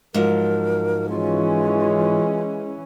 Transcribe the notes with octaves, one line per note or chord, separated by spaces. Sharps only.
G#2 F3 F#3 A#4
E3 G#3 C#4 F4